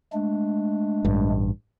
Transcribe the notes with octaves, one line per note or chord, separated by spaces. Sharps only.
G#3 A3 D4
A1 G2